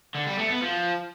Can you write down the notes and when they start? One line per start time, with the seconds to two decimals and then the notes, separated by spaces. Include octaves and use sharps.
0.15 D3
0.26 G3
0.38 A3
0.50 B3
0.62 F3